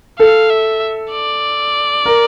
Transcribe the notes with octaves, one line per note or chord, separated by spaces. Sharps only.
A4 F5
E5
D5
A#4